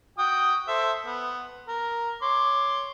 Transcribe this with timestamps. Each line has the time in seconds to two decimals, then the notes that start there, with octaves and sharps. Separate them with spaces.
0.18 F#4 G5 D#6
0.68 A4 C5 E5
1.06 B3
1.68 A#4
2.22 C#5 C6 D6